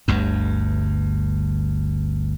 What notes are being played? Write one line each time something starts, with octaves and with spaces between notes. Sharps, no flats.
G1 D2 G2